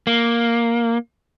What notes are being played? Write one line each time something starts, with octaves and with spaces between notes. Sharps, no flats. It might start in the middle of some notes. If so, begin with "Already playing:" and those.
A#3